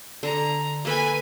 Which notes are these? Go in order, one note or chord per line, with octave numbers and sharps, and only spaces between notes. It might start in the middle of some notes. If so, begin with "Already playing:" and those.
D3 A#5
A#3 A4 B4 G#5